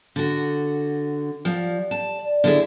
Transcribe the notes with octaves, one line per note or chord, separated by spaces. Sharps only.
D3 F#4
F3 B3 D4 G4
A5
D5
D3 A3 E4 G#4 D5 A#5